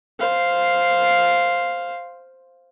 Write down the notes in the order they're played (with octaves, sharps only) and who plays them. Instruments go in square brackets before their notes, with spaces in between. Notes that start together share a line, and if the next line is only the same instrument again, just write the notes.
[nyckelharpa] C5 F5